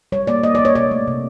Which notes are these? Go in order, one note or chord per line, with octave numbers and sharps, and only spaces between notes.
G3 C#5
A#3 D5
A#3 D#5
D5
A#3
C#5
C3 D5
A3
C3